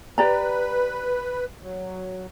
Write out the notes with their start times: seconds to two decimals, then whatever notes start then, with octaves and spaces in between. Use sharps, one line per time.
0.18 G4 B4 D5 A#5
1.62 F#3